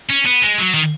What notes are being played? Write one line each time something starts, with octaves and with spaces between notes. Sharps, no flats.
C#4
B3
G#3
F#3
D#3